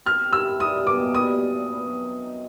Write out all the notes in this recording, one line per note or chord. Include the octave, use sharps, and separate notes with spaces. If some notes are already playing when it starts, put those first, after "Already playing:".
C4 F6
G4
E6
E4
G3 D#6
B2
D6
A#3
G3 D#6
A#2
C4
B3
F#3
D#4
D#4